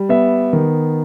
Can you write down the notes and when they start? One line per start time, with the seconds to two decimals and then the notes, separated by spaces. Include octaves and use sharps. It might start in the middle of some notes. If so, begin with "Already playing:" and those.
Already playing: G3
0.09 B3 E5
0.53 D#3